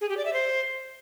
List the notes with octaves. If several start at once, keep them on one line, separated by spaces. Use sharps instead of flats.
G#4
G4
D5
E5
C5